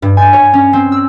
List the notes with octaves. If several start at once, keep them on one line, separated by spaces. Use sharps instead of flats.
G2
G#5
C#5
C#4
C4
E6